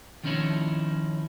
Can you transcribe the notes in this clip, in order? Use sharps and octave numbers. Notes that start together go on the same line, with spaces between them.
D#3 F3 C#4 D#4 E4 C#5